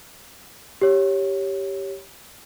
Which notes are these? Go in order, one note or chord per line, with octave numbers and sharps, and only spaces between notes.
G4 C#5